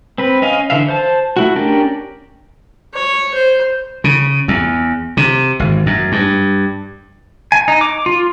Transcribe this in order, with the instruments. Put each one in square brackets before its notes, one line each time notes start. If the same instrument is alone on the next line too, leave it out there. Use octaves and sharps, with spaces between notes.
[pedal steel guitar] C4 B4
C#4 D#5 F5 G#5
D3 E3 E5 F5
C5 A5
A3 E4 F#4
C#4 D4 G4 A#4 D5
[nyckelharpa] C#5
C5
[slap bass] C#3
E2
C3
G#1
F#2
G2
[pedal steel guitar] G#5
D#4
D6
F4